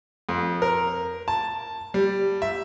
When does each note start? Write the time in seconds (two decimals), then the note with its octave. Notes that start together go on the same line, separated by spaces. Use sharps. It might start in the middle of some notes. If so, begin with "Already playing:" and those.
0.29 F2
0.62 A#4
1.28 A5
1.94 G3
2.42 E5